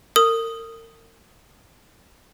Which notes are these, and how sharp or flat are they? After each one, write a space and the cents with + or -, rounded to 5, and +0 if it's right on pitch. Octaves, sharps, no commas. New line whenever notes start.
A#4 -40 D#6 +0